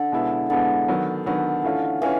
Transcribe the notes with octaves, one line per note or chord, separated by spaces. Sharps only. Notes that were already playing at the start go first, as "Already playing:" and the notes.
Already playing: D3
B2 G#3 B3 E4
B2 D3 G#3 B3 E4
D#3 F#3 B3
D3 D#3 F#3 B3
E3 A3 C#4 F4
E3 C#4 F4